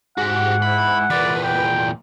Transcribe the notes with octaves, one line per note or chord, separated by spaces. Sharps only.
G#2 F#4 G4 F#5
E4 B5
E2 A#2 B4 D5
G5